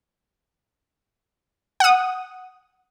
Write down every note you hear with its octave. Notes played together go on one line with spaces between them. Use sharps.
F#5 D#6